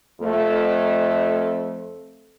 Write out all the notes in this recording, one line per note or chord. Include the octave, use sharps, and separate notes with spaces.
F2 A3